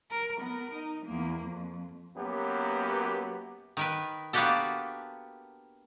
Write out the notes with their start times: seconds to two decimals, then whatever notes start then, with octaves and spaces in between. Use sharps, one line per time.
0.11 A#4
0.41 B3 A#4
0.72 D#4
1.05 E2 A#3
1.42 F2
2.17 F#2 F#3 A#3 B3 G4
3.77 D#3 A#4 B4
4.33 A#3 B3 D4 F#4 G4 A4